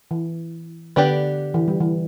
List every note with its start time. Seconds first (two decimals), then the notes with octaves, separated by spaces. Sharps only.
0.11 E3
0.96 D3 B3 D4 G4 B4 D5
1.54 E3
1.68 G3
1.80 E3